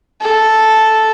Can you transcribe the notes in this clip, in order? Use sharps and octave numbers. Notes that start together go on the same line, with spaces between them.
A4